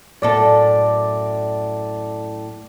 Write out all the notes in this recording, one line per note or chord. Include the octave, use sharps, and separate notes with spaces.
F#2 A2 A4 D5